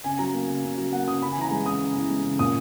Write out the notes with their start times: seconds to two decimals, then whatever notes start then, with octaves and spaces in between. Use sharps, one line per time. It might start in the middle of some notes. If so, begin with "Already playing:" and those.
0.04 C#3 G#5
0.19 F#3 A#5
0.34 A#3
0.49 C#3
0.64 C#3
0.78 F#3
0.93 A#3 F#5
1.08 C#3 D#6
1.22 C#3 B5
1.31 G#5
1.37 E3 A#5
1.51 G#3 G#5
1.66 C#3 D#6
1.81 C#3
1.96 E3
2.10 G#3
2.24 C#3
2.39 A#2 D#6